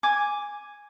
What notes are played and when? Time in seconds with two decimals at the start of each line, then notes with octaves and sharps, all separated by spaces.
0.03 G#5 D6